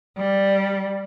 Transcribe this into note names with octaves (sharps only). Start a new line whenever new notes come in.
G3